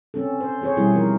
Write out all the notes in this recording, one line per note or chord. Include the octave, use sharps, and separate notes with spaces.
C4 C#4 A4
C5
C4 G#4 C5 C#5
B2 G3 C4 E4 G#4
F3 D#4 A#4